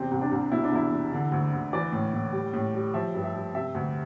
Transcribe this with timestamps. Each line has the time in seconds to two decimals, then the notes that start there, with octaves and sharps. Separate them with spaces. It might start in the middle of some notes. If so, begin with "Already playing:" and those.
Already playing: E2 C3 C4
0.11 C2
0.21 D4
0.31 C2
0.51 B2 E4
0.63 D4
0.72 E2 E4
0.92 E2
1.12 D3
1.32 D2
1.53 D2
1.73 E3 D5
1.92 A2
2.13 A2
2.33 G3
2.53 A2
2.74 G3
2.94 F3 E5
3.14 G2
3.24 E5
3.34 G2
3.54 C3 E5
3.75 D2